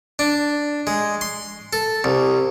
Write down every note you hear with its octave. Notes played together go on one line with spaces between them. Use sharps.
D4
G#3
C6
A4
C2